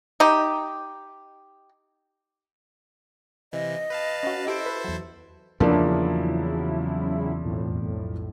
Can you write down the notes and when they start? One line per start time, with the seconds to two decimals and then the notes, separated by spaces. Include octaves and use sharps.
0.20 D#4 G4
3.53 C3 E3 D#5
3.90 B4 F5 A5
4.23 C#4 F#4
4.47 E4 G4 A4 C5 D7
4.66 B4
4.84 E2 F#3
5.60 E2 C#3 F3 F#3 A#3 C#4 D4 E4
7.42 B1 F2 A2